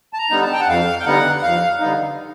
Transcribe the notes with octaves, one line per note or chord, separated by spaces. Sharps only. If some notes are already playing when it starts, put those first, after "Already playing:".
A5
A#5
D3 G3 B3 D#4
A5
G5
F#5
F2 F5
G5
D3 G3 B3 D#4 F#5
F#5
F2 F5
D3 G3 B3 D#4